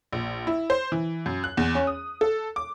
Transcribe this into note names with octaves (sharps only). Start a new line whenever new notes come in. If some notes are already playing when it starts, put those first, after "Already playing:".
A#1
E4
C5
E3
F#2
F#6
E2
C#4
D#6
A4
D6